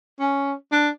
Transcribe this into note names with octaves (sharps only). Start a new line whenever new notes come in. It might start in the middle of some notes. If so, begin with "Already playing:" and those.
C#4
D4